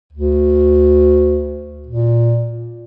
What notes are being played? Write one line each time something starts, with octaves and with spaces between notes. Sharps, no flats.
D2
A#2